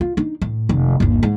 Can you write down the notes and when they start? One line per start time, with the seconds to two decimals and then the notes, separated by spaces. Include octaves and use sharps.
0.01 F4
0.17 D4 D#4
0.41 A2
0.69 F1 D#3
1.00 G1 D#2
1.23 G#2